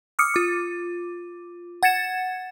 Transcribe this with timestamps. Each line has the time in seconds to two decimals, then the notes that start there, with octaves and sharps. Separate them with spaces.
0.19 D6 D#6 F6 C#7
0.34 F4 D6
1.83 F#5 G#6 A6 C#7 E7